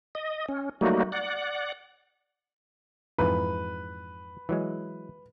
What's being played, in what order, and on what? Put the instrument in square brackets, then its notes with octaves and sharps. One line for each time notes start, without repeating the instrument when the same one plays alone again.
[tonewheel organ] D#5
C#4
F#3 G3 A3 A#3 D#4 F#4
D5 F#5
[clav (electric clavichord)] F2 G#2 E3 [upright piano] B4
[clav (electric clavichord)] E3 F#3 G#3